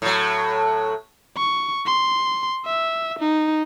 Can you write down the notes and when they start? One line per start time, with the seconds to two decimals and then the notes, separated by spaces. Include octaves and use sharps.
0.02 A2 F#3
1.37 C#6
1.86 C6
2.66 E5
3.20 D#4